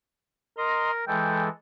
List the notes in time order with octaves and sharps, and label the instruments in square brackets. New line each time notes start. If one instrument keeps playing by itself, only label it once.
[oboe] A#4 [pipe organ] D#5 A#5 C6
[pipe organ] E3 G#3 A4 [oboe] G5